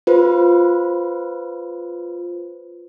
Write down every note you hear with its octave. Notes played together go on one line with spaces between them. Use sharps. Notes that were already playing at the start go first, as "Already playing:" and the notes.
F4 B4 C5